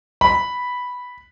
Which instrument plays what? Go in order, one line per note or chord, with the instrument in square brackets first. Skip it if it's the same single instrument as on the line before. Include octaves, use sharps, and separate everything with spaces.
[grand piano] B5